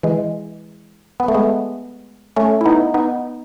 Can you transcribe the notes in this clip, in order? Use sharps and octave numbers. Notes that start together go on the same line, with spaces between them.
E3 G#3
B3
A3
G#3 B3
A3 C#4
E4
B3 D#4
B3 D#4